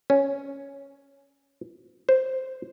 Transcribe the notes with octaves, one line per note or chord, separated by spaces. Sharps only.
C#4
C5